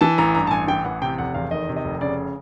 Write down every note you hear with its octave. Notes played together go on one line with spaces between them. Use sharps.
E3 A5
A1 A#5
G2 A#5
A5
A1 G#5
E3 G5
A1 F#5
C3 G5
F1 F#5
E2 F5
D#3 D#5
C3
D#5
F1
C#3 D5